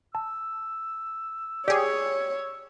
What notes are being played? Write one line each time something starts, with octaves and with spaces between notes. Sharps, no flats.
A5 E6
G4 G#4 C#5 D5 D6